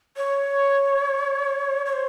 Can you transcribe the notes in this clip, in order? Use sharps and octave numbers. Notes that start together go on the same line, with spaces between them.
C#5
C#5
C5